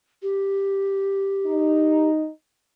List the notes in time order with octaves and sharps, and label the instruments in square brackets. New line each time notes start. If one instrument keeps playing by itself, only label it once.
[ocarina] G4
[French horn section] D#4